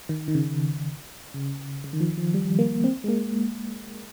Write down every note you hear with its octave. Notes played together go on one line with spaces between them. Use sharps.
D#3
D#3
C#3
C#3
C#3
D#3
F3
F3
G3
A#3
C4
G#3
A#3